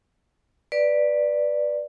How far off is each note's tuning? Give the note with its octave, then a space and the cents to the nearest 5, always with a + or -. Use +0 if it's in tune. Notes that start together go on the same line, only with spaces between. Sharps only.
B4 -10 D5 +5